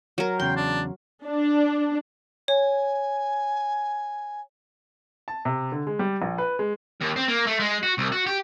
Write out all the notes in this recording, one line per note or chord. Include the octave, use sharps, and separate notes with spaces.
F#3 A#4
E2 C#3 G5 C6
D4
D4
C#5 G#5
A5
C3
D3
G#3
G3
A#1
B4
G#3
D#2
C4
A#3
A3
G#3
F#4
C2
F#4
G4